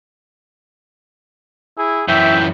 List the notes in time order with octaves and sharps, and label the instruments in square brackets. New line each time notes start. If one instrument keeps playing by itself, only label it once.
[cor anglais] E4 [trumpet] G#4
[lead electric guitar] F#2 E3 [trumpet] E5 [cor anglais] G5